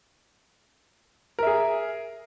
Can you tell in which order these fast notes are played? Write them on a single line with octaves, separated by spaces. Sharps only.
A#4 E5 G#4